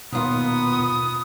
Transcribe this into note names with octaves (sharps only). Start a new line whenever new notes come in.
D#2 B2 B3 F4 D#6